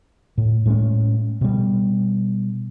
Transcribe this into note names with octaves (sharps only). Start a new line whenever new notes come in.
A2
A2 G#3 A3 C#4
B2 G3